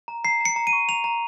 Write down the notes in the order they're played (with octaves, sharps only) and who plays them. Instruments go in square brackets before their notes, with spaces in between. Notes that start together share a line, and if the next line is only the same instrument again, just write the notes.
[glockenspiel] A#5
A#5 C7
A#5 C#7
A#5
D#7
C#6
A#5 F7
A#5